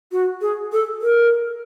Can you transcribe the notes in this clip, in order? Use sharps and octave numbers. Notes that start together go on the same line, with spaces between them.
F#4
G#4
A4
A#4